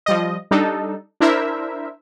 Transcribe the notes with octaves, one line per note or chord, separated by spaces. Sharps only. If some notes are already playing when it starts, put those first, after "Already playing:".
F3 G3 D#5
G3 D4 D#4 A4
D4 E4 A#4 C5 E5